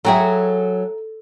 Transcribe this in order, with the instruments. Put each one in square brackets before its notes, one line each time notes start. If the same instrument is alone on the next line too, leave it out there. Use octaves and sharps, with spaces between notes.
[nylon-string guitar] F#3 F#4 G#4 [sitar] A4 [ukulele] E5 G5 A#5